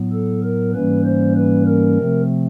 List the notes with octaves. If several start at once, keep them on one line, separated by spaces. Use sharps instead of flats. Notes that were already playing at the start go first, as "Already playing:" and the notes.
Already playing: A2 F#3 B3
A4
A#4
G#2 E3 G3 A#3 C#4 B4
C5
B4
A#4
C3 F3 A3 C4